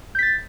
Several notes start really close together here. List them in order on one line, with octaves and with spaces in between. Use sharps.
G6 B6 A6